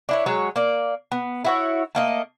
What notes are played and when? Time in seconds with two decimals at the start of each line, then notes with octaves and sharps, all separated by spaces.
0.09 D4 E4 C#5
0.26 F#3 G#3 C#5
0.56 A#3 D5
1.12 B3
1.45 E4 F#4 C#5
1.95 A3 A#3 D#5